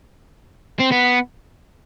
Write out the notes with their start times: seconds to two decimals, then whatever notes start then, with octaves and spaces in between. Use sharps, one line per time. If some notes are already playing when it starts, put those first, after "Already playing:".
0.80 C4
0.92 B3